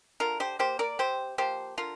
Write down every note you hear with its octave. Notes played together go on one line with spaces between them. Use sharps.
D3 F4 A#4
G4 C5
A#3 G4 C5
A#4 D5
C3 G4 C5
F3 A#3 G4 C5
D3 F4 A#4